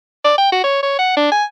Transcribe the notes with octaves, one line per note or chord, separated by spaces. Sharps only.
D5
G5
F#4
C#5
C#5
F#5
D4
G#5